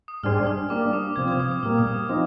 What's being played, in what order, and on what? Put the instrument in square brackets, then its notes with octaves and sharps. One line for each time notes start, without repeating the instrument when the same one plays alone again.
[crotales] D#6
[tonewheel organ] G#2 G3 D4 G#4 C5 [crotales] F6
[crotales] F6
[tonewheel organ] G3 A#3 D4 [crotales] D6
[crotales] D#6
[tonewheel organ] C3 F3 C4 [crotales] G#6
[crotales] G#6
D#6
D#6
[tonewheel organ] A#2 G3 A#3 [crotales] F6
[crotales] D#6
D#6
[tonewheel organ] F3 C4 D#4 [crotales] D#6